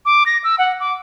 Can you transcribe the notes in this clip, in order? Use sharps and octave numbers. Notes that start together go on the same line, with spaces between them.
D6
A#6
E6
F#5
D6